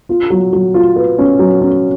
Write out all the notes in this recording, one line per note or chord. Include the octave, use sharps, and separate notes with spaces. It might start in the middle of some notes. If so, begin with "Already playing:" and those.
F4
F#3
F#3
F4
B4
C#4
F#3
C#4